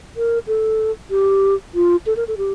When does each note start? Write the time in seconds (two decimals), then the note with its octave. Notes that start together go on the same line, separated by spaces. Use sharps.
0.17 A#4
0.47 A4
1.11 G4
1.74 F4
2.06 A4
2.17 A#4
2.28 A4
2.38 G4